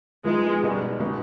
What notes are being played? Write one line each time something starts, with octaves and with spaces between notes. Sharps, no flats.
F3 G#3 B3 D#4
B2 G3 B3 D#4
B2 G#3 B3 D#4